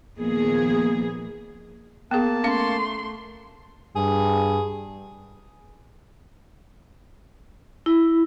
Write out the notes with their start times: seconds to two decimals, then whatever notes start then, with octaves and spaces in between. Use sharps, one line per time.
0.18 A#2 D#3 F3 A#3 B3 G#4
2.11 A#3 B3 G#4 A5
2.44 A3 C#4 F5 C6
3.96 G2 G#4
7.86 E4